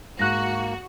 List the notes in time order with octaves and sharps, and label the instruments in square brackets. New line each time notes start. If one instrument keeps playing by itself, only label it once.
[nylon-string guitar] G#2 [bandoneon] A#3 [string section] F#4 [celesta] F#6 A#6